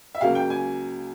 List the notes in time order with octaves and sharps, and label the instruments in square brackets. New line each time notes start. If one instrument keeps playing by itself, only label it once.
[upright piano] E5
C#2 C#3 F#3 A#3 F5
G5
G#5